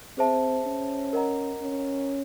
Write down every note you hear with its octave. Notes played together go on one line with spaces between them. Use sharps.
C4 G#4 C5 E5 A5
C#4
A#4 D#5 F#5 A#5
C#4